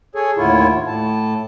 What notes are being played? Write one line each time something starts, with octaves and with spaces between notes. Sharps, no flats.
G#4 A4 C#5
D#2 A2 D3 E4 F4 C#5
A2 A5